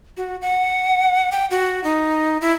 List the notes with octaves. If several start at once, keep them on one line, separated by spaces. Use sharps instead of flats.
F#4
F#5
G5
F#4
D#4
E4